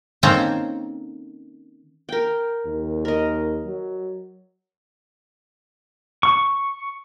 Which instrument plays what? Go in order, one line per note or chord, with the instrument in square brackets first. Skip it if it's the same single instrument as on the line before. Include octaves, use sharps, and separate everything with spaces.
[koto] D#3 A#3 C4 C#4 A4 A#5
[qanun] A#4 G5
[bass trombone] D#2
[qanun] A#4 D#5
[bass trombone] F#3
[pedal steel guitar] C#6